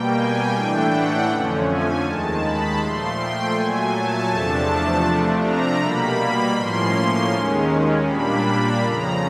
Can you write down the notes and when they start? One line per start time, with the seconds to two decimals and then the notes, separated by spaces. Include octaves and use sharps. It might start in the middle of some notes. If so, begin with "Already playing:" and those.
Already playing: B2 G3 A#3 G5
0.15 G#5
0.52 A2 E3 A3 D4 G5
0.90 F#5
1.28 F2 D3 F3 A3 C#4
1.65 G#5
2.03 D#2 D#3 G#3 A5
2.41 B5
2.78 A#2 F3 A3 C6
3.16 G5
3.54 A#2 F#3 A3 G#5
3.92 A5
4.29 E2 C3 F3 A3 D4 A5
5.05 C3 F3 A3 D4
5.43 A#5
5.80 B2 G3 A#3 B5
6.18 B5
6.56 A2 F3 A#3 C#4 C6
6.93 C6
7.31 D#2 D#3 G#3 C#4
8.06 A#2 G3 A#3 D4 B5
8.45 B5
8.82 F2 C#3 F3 A#5